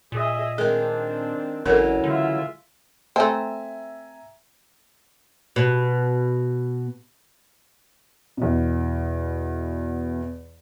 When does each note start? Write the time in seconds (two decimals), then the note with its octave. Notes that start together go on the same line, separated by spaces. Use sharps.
0.12 A#2 G#4 D#5 E5
0.58 D#3 G#3 C4 D4 G#4
1.66 A1 C#3 E3 F#3 A4 A#4
2.04 D3 G#3 F4 E5
3.16 A3 C4 E5 G#5 A#5
5.56 B2
8.37 E2 B2